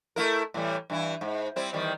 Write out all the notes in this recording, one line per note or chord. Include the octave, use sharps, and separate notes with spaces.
A3 E4 A#4
A2 E3 G3
G2 E3 E4
G#2
G3 C4 E4
E2 D#3 G3